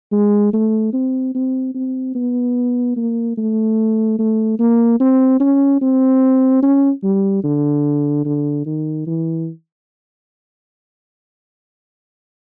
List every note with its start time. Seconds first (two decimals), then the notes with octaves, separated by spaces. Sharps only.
0.12 G#3
0.53 A3
0.93 C4
1.34 C4
1.75 C4
2.15 B3
2.97 A#3
3.37 A3
4.19 A3
4.59 A#3
5.00 C4
5.40 C#4
5.81 C4
6.62 C#4
7.03 G3
7.44 D3
8.25 D3
8.66 D#3
9.07 E3